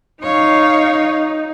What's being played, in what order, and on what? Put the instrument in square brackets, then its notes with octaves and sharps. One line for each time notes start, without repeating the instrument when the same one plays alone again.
[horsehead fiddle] D#4 [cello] C#5 F5